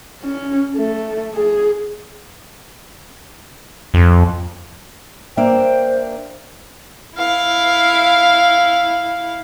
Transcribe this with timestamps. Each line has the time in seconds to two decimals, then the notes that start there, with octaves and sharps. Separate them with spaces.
0.23 C#4
0.77 A3
1.35 G#4
3.94 F2
5.37 A#3 D4 C5 E5 G5
7.16 E4 F5